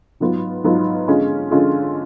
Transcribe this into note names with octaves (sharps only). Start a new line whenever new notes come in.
G#2 F#3 B3 F4
G#2 F#3 B3 F4
D3 G#3 C#4 F4
D3 G#3 C#4 F4